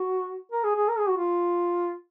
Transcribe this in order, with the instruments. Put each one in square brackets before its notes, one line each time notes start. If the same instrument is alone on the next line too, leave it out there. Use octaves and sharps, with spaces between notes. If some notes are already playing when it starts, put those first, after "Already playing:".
Already playing: [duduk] F#4
A#4
G#4
G#4
A#4
G#4
F#4
F4